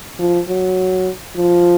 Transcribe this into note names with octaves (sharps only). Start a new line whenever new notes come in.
F3
F#3
F3